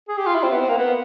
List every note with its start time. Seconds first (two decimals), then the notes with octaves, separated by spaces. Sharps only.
0.09 G#4
0.18 G4
0.27 F4
0.35 E4
0.43 C4
0.52 B3
0.61 C4
0.69 A#3
0.78 B3